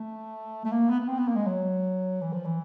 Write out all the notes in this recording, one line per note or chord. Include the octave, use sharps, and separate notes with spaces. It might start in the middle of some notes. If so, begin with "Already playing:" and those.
Already playing: A3
A3
A#3
B3
B3
C4
B3
A#3
G#3
F#3
E3
F3
E3